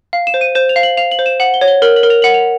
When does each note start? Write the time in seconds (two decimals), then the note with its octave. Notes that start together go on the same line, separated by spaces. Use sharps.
0.13 F5
0.27 E7
0.34 C5
0.41 D#7
0.55 C5 E7
0.69 F7
0.76 F5
0.83 F#7
0.97 F5 F7
1.11 F#7
1.19 C5
1.26 E7
1.40 F#5 F#7
1.54 G7
1.61 C#5
1.68 G7
1.82 A#4 F#7
1.96 F#7
2.03 A#4
2.10 F7
2.22 F#5 F#7
2.34 F7